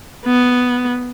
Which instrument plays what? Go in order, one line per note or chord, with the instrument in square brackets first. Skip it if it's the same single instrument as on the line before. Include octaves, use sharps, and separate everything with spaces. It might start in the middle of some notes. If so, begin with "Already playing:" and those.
[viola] B3